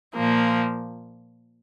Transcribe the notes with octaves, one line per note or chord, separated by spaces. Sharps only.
A#2 F3 A#3